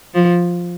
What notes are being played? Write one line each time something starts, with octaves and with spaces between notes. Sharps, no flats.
F3